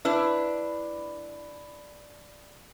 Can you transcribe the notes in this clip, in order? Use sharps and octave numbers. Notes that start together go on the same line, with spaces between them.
D4 E4 B4